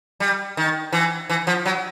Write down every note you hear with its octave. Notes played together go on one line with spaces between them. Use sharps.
G3
D#3
E3
E3
F3
F#3